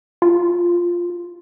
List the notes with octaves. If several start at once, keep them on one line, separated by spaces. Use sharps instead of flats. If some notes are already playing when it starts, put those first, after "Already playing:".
F4